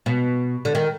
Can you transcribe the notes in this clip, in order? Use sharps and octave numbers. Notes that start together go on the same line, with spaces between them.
B2
D3
D#3